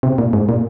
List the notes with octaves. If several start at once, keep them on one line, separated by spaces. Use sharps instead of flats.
C3
A#2
G#2
A#2